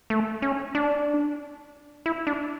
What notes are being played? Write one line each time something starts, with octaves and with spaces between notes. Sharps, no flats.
A3
C#4
D4
E4
D4